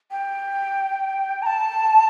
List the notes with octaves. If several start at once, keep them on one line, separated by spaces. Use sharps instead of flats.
G5
A#5
A5